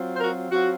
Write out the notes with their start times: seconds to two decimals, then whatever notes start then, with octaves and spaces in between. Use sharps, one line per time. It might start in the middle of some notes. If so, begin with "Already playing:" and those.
Already playing: F#3 C4 F4
0.16 C5
0.20 F#4 A#4
0.51 F#3 C4 F4 F#4